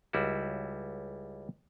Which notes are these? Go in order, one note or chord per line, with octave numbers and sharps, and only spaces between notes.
C#2 G3 E4 F#4